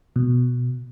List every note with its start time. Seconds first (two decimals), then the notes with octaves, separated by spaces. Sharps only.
0.16 B2